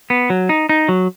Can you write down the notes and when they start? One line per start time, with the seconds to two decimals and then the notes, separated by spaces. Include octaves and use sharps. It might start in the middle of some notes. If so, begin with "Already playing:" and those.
0.10 B3
0.30 F#3
0.49 D#4
0.69 D#4
0.89 F#3